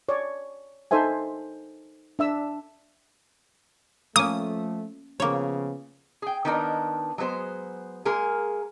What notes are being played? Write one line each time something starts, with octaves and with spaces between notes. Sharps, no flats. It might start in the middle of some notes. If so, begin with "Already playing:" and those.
C#5 D5
D#4 A4 C5 E5 G#5
D4 E5 E6
F3 A3 A#3 C#4 D#6
C#3 F3 A#3 B3 C#5
G#4 G5
D#3 B3 D4 D#4 F#4 A#4
F#3 G#3 B3 C5
G#3 A#3 G#4 A#4